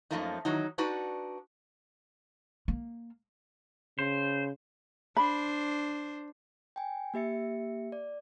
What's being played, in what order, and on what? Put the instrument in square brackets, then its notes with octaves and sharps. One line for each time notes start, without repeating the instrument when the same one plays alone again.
[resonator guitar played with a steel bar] F#2 C#3 F3 A3 A#3 D#4
D#3 E3 F#3 D#4
D4 D#4 F#4 B4 D5
[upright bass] A#3
[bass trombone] C#3 [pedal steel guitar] C5
[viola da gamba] D4 C5 [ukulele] B5
[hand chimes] G5 G#5
A#3 G4 E5 C#7
D5